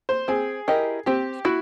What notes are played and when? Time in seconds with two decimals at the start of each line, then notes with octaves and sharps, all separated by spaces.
0.09 C5
0.28 C4 G#4
0.68 E4 G4 A#4 D#5
1.06 C4 G4
1.45 E4 F#4